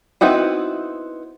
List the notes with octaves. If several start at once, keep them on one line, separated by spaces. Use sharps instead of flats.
B3 C4 D#4 E4 F#4